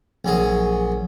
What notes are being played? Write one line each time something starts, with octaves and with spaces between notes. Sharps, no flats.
A#1 F#3 G#4